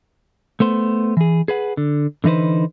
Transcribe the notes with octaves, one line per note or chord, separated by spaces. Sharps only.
A3 B3 C5
E3 G#4
G#4 B4 F#5
D3
D3 E3 D#4 B4 C5